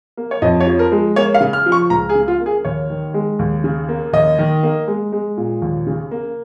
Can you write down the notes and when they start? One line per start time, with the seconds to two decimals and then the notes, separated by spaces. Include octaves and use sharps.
0.17 A#3
0.31 C#5
0.42 F2 D#5
0.60 C#5
0.67 F3
0.79 A#4
0.92 G#3
1.16 A#3 C#5
1.34 F5
1.41 C#3
1.53 F6
1.66 F3
1.72 C#6
1.90 C#2 A#5
2.09 G#4
2.15 C#3
2.28 F4
2.40 A#3
2.46 G#4
2.65 D#2 C#5
2.90 D#3
3.14 G#3
3.39 D#2
3.64 C#3
3.89 A#3
4.13 D#2 D#5
4.39 D#3
4.63 A#3
4.87 G#3
5.12 G#3
5.37 A#2
5.62 D#2
5.87 C#3
6.11 A#3